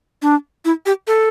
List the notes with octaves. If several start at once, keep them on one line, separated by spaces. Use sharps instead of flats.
D4
E4
G4
A4